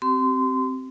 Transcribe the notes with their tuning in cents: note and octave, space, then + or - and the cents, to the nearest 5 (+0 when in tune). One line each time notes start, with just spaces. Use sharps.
C4 +0 G4 -40 C6 -25